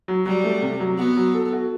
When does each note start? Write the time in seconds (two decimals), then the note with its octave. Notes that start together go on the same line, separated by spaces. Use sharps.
0.08 F#3
0.26 F#3 G3
0.44 A3
0.62 C3
0.80 F#3
0.98 B3 F#4
1.17 F#3
1.34 A4
1.53 F#4